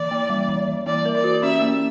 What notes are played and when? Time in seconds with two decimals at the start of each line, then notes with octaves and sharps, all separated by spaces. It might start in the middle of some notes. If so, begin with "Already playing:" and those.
Already playing: E3 D5
0.11 A#3
0.30 G3
0.49 E3
0.68 E3
0.86 A#3 D5
1.05 A#4
1.15 D5
1.24 F#4
1.43 C#4 E5
1.62 A#3